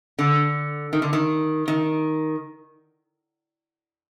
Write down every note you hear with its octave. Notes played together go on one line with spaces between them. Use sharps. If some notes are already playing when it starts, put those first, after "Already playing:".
D3
D#3
D3
D#3
D#3